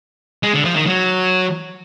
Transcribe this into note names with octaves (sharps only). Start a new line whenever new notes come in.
G#3
D3
F3
D#3
F#3